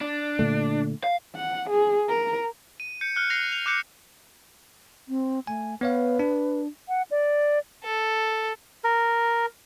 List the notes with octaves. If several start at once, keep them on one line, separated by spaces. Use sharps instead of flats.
D4
A#2 D3 A3
F5
F#5
G#4
A#4
D#7
G6 C#7
F6 F#6 C#7
F#6 A#6 C7 F7
F7
D6 F#6 G6 C#7
C4
A3 G#5
B3 B4 C#5 F5
D4
F#5
D5
A4
A#4